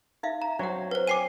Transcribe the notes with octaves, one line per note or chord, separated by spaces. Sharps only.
D#4 E5 F5
A#5
F#3 C4 D4 F#5
B4 C5
G5 G#5 D6 C7 D#7